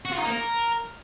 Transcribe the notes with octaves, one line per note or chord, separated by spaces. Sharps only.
F#4
F4
D#4
A#3
A#4